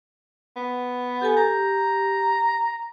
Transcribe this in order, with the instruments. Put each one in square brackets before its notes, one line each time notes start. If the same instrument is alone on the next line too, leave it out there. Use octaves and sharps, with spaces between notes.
[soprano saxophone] B3
[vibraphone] G4 A4 G#5
[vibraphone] G4 [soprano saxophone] A#5